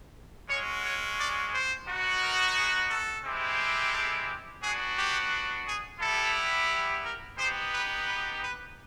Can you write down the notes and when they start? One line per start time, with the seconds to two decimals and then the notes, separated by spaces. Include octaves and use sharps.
0.49 G#3 C#4 F#4 C#5
0.84 C#5
1.18 D5
1.53 C5
1.87 B3 D#4 F#4
2.22 A#4
2.56 G#4
2.90 A4
3.25 G#3 C4 E4 G4
3.93 A4
4.62 B3 D4 F#4 G#4
4.97 G4
5.66 G#4
6.00 G3 B3 E4 G4 A4
7.03 A#4
7.38 B3 D#4 G4 C5
7.73 B4
8.07 B4
8.42 B4